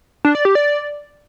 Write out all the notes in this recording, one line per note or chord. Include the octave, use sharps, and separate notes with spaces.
D4
D5
G4
D5